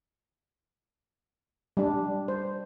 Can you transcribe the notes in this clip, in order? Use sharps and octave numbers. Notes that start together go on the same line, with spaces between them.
G3 D4
C5